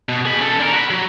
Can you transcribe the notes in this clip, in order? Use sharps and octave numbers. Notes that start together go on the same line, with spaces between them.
B2
G#4 B5
C#3 A4
D3 A#4
F#4 B5
F#3